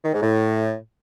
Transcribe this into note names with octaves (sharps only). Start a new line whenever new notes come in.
D#3
G#2
A2